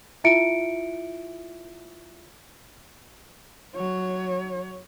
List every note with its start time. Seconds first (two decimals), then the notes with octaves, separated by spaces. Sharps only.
0.24 E4 F4 E5 C#7 D7
3.75 F#3 C#5